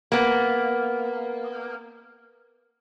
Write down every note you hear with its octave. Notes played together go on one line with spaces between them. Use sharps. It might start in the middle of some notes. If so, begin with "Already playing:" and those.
A#3 B3